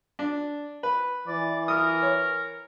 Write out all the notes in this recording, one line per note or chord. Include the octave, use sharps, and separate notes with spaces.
D4
B4
E3 D5
A#4 D#6
C#5